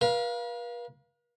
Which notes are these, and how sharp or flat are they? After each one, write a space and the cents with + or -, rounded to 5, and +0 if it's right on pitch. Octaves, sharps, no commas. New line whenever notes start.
B4 -45 F5 +0